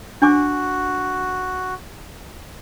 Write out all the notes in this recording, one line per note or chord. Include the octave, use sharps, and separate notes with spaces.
D4 F#4 G#5 D6